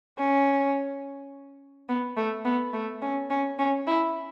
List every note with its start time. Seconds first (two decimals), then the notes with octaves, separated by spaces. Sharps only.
0.18 C#4
1.89 B3
2.17 A3
2.45 B3
2.73 A3
3.02 C#4
3.30 C#4
3.59 C#4
3.87 E4